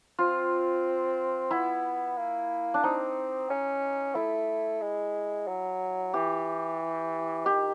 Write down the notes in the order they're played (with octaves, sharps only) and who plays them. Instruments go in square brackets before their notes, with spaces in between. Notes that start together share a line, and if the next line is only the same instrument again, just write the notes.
[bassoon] C4 [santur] F4
[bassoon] B3 [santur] E4
[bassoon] A#3
[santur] D4
[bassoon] C4 [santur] D#4
[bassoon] C#4
[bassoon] A3 [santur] E4
[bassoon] G#3
F#3
[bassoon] E3 [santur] G4
[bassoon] D#3 [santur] G4